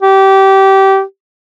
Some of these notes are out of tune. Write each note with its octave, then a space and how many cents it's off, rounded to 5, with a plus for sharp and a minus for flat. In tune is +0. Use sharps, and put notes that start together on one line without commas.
G4 -20